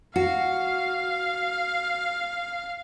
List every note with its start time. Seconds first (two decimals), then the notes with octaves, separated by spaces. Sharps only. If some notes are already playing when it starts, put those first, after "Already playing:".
0.16 F#4 F5